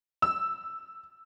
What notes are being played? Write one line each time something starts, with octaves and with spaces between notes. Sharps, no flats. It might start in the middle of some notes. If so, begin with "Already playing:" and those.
E6